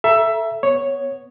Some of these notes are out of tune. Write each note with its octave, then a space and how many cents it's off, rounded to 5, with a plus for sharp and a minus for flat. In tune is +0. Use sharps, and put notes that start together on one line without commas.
A4 +0 E5 +15 A#5 +35
B3 +0 C#5 +0